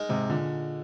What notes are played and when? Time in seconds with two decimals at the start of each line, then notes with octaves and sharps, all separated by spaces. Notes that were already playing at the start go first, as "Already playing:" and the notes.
Already playing: G#3 D#4 A#4 D#5
0.09 G#2 C3
0.29 A#2 D3